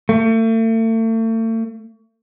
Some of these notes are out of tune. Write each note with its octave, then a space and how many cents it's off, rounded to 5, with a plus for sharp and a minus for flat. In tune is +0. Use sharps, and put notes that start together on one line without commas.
A3 +40